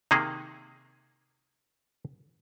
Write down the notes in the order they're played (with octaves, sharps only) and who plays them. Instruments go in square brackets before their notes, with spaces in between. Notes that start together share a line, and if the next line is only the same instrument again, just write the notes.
[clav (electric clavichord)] C3 D#3 A#3 G#4